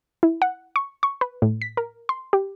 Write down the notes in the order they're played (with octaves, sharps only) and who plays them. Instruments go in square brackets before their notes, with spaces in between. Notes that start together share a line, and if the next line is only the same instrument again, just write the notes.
[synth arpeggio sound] E4
F#5
C#6
C#6
B4
A2
B6
A#4
C6
G4